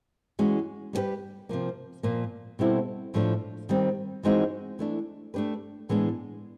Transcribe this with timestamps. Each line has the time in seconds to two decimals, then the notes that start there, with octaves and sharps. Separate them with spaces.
0.39 E3 G#3 C#4 F#4
0.93 G3 B3 E4 G4 B4
1.49 C3 F3 A#3
2.03 A#2 F3 A#3
2.59 B2 G3 C4 E4 A4
3.14 A2 F3 A3 D4
3.69 D#3 G3 C4
4.23 E3 G#3 C4 D#4 F#4
4.79 E3 A3 D4
5.34 A3 D4 G4 B4
5.89 A2 E3 G#3 B3 D4